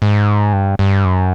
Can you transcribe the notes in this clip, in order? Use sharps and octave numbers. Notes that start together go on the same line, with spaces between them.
G#2
G2
G2
F#2